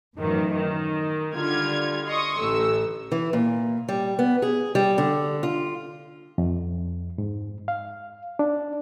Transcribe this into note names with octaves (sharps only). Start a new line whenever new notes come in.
F#2 A2 D#3 E3 F#3
D#3
D3 G3 F4 F6 G#6
D#5 C6 C#6 D#6
A1 A2 E6
E3
A#2
G3
B3
G#4
G3
D3
F4
F2
G#2
F5
D4